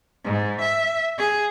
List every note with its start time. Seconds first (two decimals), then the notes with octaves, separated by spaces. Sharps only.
0.25 G#2
0.61 E5
1.18 G#4